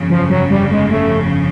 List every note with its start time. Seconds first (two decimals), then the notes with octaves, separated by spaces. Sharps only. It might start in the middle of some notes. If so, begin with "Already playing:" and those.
Already playing: G1 F2 C#3
0.10 F3
0.30 F#3
0.51 G3
0.72 G#3
0.91 A3